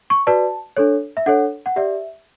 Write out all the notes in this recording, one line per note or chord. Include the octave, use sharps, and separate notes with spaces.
C#6
F#4 B4 D5 A5
D4 A4 C#5
E5
D4 A4 C#5 F#5
F#5
G4 D5 E5